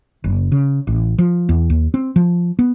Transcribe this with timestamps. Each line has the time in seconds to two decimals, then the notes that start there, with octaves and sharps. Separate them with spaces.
0.24 F#1
0.52 C#3
0.87 A1
1.18 F3
1.49 E2
1.70 D#2
1.94 C4
2.16 F3
2.59 B3